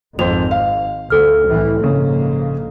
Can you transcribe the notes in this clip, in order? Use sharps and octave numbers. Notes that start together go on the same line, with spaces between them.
G#1 F2 G#2 C5 F7
F5
D2 A4 F6
C2 A2 E3
A#1 G#2 C#3 A#3